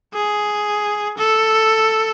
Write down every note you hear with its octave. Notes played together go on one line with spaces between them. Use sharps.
G#4
A4